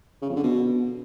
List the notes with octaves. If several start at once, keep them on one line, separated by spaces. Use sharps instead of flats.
C#3
F2
D3
B2